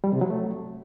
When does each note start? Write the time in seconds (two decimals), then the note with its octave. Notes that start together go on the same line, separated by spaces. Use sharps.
0.04 G3
0.12 C3
0.21 F#3
0.30 A3